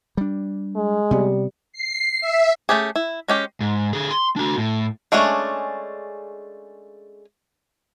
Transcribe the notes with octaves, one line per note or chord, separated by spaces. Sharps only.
G3 D4
G#3
C3 G3 B3
C7
E5
A3 C#4 G4 G#4
E4
G#3 C#4 G4
G#2
D3 G#4
C6
D4 F#4
A2
G#3 A3 C#4 D4 G#4